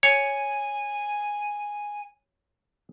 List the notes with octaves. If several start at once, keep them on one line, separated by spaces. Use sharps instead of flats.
C#5 G#5